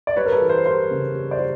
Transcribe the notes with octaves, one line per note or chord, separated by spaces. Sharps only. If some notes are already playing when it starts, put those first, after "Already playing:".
D5
G3 B4 C#5
A#4
A4 B4
E3
A#4 C5
G3 A#4 C5
C#3
G3
C5 D5
G3